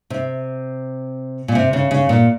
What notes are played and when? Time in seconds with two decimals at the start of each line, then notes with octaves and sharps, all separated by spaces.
0.10 C3
1.48 A#2
1.55 C3
1.73 C#3
1.91 C#3
2.09 A#2